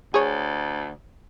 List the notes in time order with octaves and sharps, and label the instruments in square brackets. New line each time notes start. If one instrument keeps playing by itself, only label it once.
[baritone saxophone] D2 [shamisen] G#4 C#5